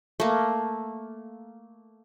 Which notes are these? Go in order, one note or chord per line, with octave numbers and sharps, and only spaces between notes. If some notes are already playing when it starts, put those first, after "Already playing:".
A3 A#3